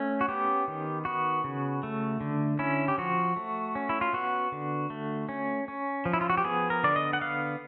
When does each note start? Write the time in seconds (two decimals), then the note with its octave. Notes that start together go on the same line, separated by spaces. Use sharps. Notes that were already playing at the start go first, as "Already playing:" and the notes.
Already playing: A3 C#4
0.21 F#4
0.29 B3 G4
0.68 D#3
1.05 B3 F#4
1.44 C#3
1.83 A3
2.21 D3
2.59 C#4 E4
2.88 G4
2.98 F3 F#4
3.36 A3
3.75 C#4
3.89 E4
4.01 F4
4.13 B3 F#4
4.52 D3
4.90 A3
5.29 C#4
5.68 C#4
6.05 F3
6.13 E4
6.21 F4
6.30 F#4
6.37 G4
6.44 B3 G#4
6.70 A#4
6.84 D3 D5
6.96 D#5
7.13 F#5
7.21 B3 F5